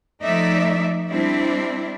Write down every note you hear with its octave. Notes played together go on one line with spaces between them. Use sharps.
F3 A3 D#4 D5 E5
G3 C4 D4 E4